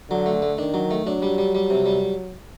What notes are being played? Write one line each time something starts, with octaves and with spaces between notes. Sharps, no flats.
D3 F#3
A3
A3
D#3 D4
F#3
A3
F#3 D4
G3
G3
G3
C3
G3